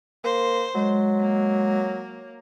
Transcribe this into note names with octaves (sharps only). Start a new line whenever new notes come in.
A#3 C5
F#3 G#3
A#3